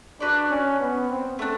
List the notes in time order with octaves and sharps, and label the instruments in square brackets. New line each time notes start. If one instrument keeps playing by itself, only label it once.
[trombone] D4 [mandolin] F#4 B4 D5
[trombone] C#4
B3
C4
[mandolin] A3 D4